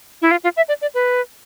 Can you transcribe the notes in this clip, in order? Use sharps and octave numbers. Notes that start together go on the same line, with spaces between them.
E4
F4
F4
E5
D5
D5
B4